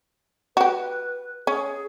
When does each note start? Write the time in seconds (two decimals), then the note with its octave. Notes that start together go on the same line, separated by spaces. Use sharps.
0.57 F#4 G4 B4
1.47 C#4 G#4